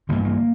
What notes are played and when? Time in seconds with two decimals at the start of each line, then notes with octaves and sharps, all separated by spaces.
0.09 A1 G2 D3 A#3
0.25 A#3